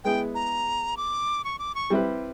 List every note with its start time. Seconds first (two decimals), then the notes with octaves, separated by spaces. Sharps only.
0.04 G#3 B3 E4 G#4 G5
0.35 A#5
0.97 D6
1.44 C#6
1.59 D6
1.75 C#6
1.90 G3 C4 E4 G4 B4